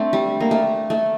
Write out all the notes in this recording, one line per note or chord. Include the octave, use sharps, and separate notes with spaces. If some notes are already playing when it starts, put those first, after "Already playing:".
Already playing: A3 C4 D4
G3
A#3
A3
A3